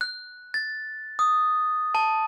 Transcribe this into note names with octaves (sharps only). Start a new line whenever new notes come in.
F#6
A6
D#6
A5